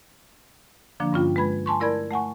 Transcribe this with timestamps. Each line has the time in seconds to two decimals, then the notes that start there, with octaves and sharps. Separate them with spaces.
1.00 D3 F3 A#3 D4
1.13 G2 C#4 F4 G5
1.36 G#3 B4 B5 G#6
1.66 G#5 A5 C6 C#6
1.80 A3 E4 A#4 D5 B5 G#6
2.11 A3 F#5 G#5 C#6